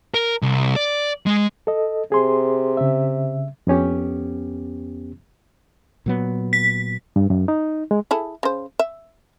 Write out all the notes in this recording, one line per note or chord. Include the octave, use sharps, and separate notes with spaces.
A#4
C2
D5
G#3
A4 D#5
C3 G#4 C6
C#3 E5
F2 B3 C#4 G4
A#2 F#3 B3
B6
G2
F#2
D#4
G#3
E4 G#4 A4
C#3 C5
E5